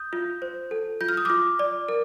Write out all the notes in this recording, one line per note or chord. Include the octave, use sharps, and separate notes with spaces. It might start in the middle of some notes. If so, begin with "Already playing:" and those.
Already playing: D#6 G6
F4
C5
A4
F4 G6
F6
D#6
F4 D6 F6
D5
A#4